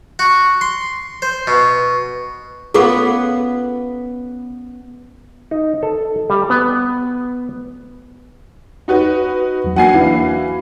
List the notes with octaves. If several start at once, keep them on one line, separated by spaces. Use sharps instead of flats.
F#4
C6
C5
B2
B3 C#4 F4 A4 A#4 D6
D#4
A4
G3
B3
D#4 F#4 B4
E2 F#3
A#3 D4 F#4 F#5 G#5 C7
E3 F5